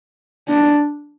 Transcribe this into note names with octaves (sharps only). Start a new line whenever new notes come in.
D4